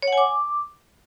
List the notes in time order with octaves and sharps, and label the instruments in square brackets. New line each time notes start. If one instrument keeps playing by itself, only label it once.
[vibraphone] C#5
F#5
G#5
D6